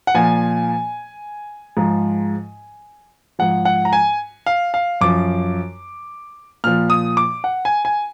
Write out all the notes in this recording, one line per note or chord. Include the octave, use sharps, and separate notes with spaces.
F#5
A#2 F3 G#5
G#2 F3
G#2 F3 F#5
F#5
A#5
G#5
F5
F5
F#2 F3 D6
A#2 F3 F6
D#6
D6
F#5
G#5
G#5